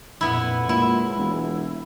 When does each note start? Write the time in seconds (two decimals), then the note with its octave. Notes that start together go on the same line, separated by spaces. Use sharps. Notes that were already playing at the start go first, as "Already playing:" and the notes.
0.21 F2 A#2 B3 E4
0.69 A#2 F#3 G#3 E4
1.19 E1